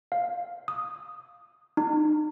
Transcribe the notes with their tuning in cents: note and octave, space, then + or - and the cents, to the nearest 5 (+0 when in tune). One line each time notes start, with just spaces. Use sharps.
F5 +5
D#6 +0
D#4 -30